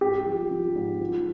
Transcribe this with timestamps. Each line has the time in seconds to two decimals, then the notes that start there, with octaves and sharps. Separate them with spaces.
0.01 G#2 G4
0.26 F3
0.51 F3
0.76 G#2
1.01 F3